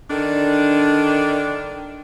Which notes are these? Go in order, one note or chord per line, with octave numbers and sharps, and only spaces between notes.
D3 D#3 D4